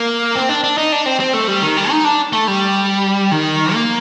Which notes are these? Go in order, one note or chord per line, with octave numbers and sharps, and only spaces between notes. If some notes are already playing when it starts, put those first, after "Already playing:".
Already playing: A#3
C4
D4
D4
D#4
D4
C4
C4
A3
G3
D#3
G3
D#4
D4
A3
G3
D#3
A#3